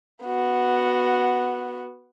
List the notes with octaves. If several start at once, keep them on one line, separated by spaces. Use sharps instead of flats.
B3 F#4